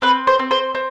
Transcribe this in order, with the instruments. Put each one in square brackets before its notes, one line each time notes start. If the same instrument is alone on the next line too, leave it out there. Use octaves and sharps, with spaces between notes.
[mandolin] C4 B4
C5
C4
C5
C4